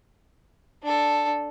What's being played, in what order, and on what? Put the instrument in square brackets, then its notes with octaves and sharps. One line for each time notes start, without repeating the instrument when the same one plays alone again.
[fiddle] D4 A4